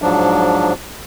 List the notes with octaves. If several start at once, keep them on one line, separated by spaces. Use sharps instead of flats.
G#2 F3 F#3 D4